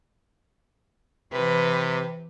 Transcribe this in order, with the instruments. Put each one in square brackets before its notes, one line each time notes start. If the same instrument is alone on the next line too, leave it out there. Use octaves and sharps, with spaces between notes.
[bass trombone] C3 [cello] E3 B4